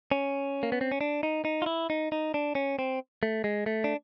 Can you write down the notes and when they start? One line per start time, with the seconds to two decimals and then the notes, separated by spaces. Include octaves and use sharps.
0.11 C#4
0.63 A#3
0.72 B3
0.81 C4
0.92 C#4
1.01 D4
1.23 D#4
1.45 D#4
1.62 F4
1.66 E4
1.90 D#4
2.12 D#4
2.34 D4
2.55 C#4
2.79 C4
3.23 A3
3.44 G#3
3.66 A3
3.84 D4